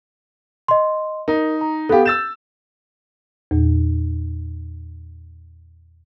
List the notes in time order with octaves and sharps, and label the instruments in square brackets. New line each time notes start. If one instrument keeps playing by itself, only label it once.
[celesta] D#5 C6
[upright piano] D#4 [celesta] A#4
[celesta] A#5
[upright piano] B3 G4 [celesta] A4 F5
[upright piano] E6 A6 E7 [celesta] G6
[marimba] E2 A#2